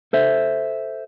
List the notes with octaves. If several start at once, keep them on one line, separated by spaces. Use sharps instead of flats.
A4 C5 E5